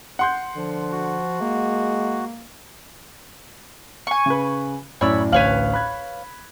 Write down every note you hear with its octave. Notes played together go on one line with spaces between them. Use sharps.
F#5 C6 G6
D3 F3
F#4
G#3 A#3
G#5 C#6
C#3 B4
F#2 A2 C#5 D5 B5 E6
A1 D2 B4 C#5 F5 F#7
B5 F#6 G#6